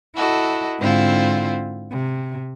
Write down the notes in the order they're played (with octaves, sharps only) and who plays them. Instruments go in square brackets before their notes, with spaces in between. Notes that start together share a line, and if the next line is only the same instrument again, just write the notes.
[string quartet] E4 F#4 A4 D#5
G#2 D3 C4 E4 F4
C3